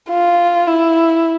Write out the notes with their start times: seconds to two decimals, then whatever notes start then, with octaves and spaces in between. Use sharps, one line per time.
0.10 F4
0.67 E4